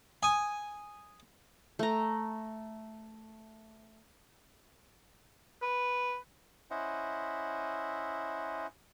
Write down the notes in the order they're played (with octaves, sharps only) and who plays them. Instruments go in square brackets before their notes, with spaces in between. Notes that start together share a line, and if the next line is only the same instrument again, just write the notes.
[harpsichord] G#5 D#6
[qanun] A3 A#5
[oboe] B4
[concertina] C#4 E4 C5 D#5 E5 F#5